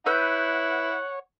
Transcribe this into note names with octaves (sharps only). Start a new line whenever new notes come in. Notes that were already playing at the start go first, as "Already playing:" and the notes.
E4 B4 C#5 F#5 E6 G6